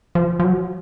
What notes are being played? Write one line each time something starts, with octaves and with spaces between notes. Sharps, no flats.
F3
F3
F#3